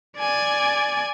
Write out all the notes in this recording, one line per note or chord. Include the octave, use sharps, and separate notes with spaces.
D5 G#5